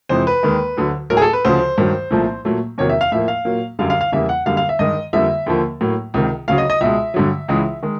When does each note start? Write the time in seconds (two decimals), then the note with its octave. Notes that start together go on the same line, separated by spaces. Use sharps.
0.09 F2 C3 E3 G#3 C5
0.27 B4
0.43 D#2 D#3 G#3
0.77 D2 D3 F#3
1.10 A2 F#3 A3 A#4
1.17 G#4
1.22 A4
1.33 B4
1.45 D2 C#3 F3 C5
1.78 G2 D#3 F#3
2.11 C2 A#2 F3 A3
2.45 A#2 F#3 A3
2.78 E2 C3 D#3 F#3 A#3 C#5
2.89 E5
3.01 F5
3.12 A2 F3 A#3 E5
3.28 F5
3.45 A#2 F#3 A#3
3.79 F#2 D3 G3 F5
3.90 F5
4.01 F5
4.12 E2 C#3 E3 G3 A#3 E5
4.29 F#5
4.46 F#2 D3 G3 A#3 F5
4.57 F5
4.69 E5
4.79 G2 D#3 G#3 D#5
5.13 F2 D3 G3 A#3 E5
5.46 D#2 D3 F3 A#3
5.81 A2 F#3 A#3
6.14 C#2 C3 D#3
6.48 D2 C#3 F#3 F5
6.58 D#5
6.70 D#5
6.81 C#2 B2 G#3 E5
7.14 G2 D3 F#3
7.48 C#2 C#3 E3 G#3
7.83 D#3 G#3